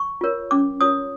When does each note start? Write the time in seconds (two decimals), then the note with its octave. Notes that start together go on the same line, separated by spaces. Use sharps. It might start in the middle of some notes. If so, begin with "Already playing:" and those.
Already playing: C#6
0.21 F4 A#4 C#5
0.51 C#4 D6
0.81 F4 A#4 C#5 D#6